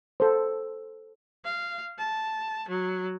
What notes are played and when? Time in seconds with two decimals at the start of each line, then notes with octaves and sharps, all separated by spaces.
0.20 A4 C5
1.44 F5
1.99 A5
2.69 F#3